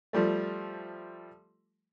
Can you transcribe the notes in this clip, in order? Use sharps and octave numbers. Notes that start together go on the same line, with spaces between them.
F3 G3 A3